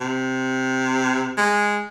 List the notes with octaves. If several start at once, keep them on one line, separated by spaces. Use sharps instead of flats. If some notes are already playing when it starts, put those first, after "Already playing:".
C3
G#3